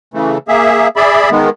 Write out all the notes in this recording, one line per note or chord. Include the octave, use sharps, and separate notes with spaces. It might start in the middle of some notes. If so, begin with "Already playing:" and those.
C#3 E3 A3
A#3 G#4 E5
G#4 D5 E5 B5
D#3 G#3 B3